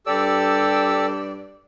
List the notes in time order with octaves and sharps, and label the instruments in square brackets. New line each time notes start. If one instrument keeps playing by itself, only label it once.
[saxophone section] G2 D5 [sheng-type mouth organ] G4 A4 E6